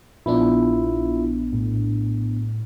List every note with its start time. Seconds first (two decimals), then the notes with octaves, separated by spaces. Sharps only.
0.26 A#1 B3 D4 E4 F4
1.53 A2